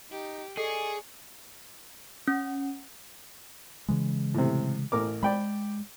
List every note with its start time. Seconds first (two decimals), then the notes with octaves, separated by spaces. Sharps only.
0.11 D#4 G4
0.57 G#4 A4 D5 D#5 G#5 C#6 C7
2.28 C#4
3.88 C#3 E3 G#3
4.34 A2 C3
4.92 A1 A#4 D6
5.23 G#3 D5 G5 B5